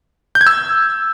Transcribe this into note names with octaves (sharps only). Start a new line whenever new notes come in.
G6
G#6
E6